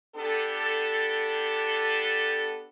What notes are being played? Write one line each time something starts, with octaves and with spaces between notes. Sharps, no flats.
B3 D4 G4 A4